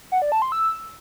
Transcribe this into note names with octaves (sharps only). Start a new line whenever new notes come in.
F#5
D5
A5
C6
E6